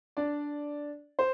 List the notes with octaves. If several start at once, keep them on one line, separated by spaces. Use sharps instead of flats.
D4 D5
C5